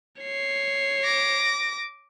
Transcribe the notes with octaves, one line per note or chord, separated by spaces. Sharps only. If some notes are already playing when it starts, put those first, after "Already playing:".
C#5 C7
D6 A#6